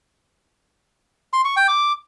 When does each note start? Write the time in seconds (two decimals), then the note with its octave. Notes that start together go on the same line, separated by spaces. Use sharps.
1.33 C6
1.45 C#6
1.57 G5
1.68 D6